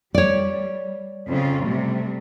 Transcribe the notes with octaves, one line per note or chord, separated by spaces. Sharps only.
G3 C#5 D5
F2 C#3 F4
C3 G3 A3